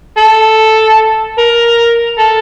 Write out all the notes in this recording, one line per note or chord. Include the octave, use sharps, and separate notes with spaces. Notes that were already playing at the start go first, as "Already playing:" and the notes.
A4
A#4
A4